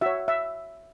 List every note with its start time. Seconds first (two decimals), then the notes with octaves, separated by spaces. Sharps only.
0.01 F#4 C#5 E5
0.28 E5